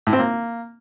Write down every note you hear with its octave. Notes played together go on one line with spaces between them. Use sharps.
A2
C4
A#3